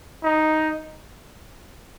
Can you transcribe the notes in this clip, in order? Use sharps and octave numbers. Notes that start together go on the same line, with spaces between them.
D#4